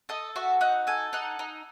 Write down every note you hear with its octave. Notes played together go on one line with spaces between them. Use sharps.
A4 D#5
F#4 E5
D#4 F#5
A4 G#5
D#4 F#5
D#4